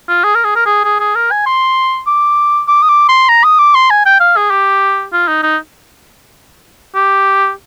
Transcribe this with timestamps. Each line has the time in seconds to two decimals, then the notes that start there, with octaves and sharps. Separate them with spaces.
0.08 F4
0.24 G#4
0.35 A#4
0.44 G#4
0.55 A#4
0.66 G#4
0.84 G#4
1.00 G#4
1.15 A#4
1.31 G#5
1.46 C6
2.07 D6
2.68 D6
2.82 D#6
2.89 D6
3.09 C6
3.29 A#5
3.44 D#6
3.59 D6
3.74 C6
3.90 G#5
4.05 G5
4.20 F5
4.36 G#4
4.50 G4
5.12 F4
5.28 D#4
5.43 D#4
6.95 G4